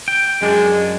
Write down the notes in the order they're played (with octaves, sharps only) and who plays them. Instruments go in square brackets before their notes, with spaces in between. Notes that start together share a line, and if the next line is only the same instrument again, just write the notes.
[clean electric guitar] G5
[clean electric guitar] F#2 D4 [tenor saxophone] G#3